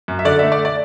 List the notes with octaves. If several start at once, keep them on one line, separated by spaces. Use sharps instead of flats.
F#2
E5
D3 D5
A3 E5
D5
D5